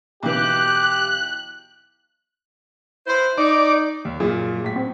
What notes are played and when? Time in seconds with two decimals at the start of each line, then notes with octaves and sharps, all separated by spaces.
0.23 B1 E3 G4 F#6
3.07 E4 B4 C5
3.38 D#4 D5
4.05 D#2
4.20 F#2 A#2 G#4
4.64 A2 B6
4.76 C4